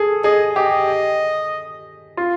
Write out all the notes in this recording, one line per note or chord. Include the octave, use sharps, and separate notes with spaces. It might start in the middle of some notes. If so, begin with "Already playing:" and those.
Already playing: G#4 A4
G#4 D#5
G4 D#5
F4